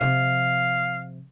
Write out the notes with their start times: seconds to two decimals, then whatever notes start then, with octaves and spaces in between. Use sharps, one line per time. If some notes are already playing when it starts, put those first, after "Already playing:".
0.01 C3 F3 F5